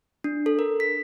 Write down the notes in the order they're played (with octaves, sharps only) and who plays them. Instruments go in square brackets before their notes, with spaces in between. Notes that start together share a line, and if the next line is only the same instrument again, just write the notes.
[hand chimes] D4
A4
A#4
B6